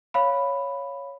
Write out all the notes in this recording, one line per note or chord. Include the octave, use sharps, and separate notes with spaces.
C#5 F5 B5